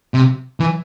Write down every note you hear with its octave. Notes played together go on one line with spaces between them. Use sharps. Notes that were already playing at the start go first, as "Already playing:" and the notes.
C3
E3